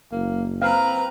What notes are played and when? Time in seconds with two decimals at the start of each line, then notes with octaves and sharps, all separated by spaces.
0.12 F#1 A#3
0.62 C4 B4 F5 A#5